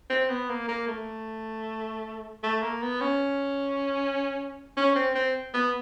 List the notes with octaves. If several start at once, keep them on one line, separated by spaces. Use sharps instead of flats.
C4
B3
A#3
A#3
A3
A3
A#3
B3
C#4
C#4
C4
C4
B3